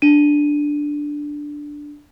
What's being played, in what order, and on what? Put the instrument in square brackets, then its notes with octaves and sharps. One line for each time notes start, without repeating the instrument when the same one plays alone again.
[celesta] D4 D#7